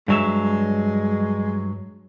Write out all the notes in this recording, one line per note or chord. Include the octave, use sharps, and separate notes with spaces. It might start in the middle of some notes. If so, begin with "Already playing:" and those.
G2 F#3 G#3 E5